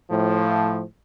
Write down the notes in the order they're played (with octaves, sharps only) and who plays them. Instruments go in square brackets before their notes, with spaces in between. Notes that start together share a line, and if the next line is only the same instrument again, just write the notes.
[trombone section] A2 F3